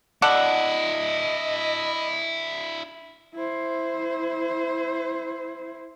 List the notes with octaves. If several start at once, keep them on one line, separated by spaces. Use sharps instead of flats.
D4 E4 A4 D5 D#5 F#5
E4 C5